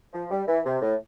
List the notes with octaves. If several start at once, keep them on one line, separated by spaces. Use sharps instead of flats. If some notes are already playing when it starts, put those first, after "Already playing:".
F3
G3
E3
C3
A2